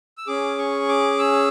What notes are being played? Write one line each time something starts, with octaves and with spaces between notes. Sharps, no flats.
E6
C#4 G#4 D6
C#6
D6
E6